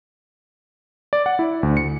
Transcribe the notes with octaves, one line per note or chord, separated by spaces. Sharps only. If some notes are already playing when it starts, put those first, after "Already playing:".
D5
F#5
E4
D2
C#7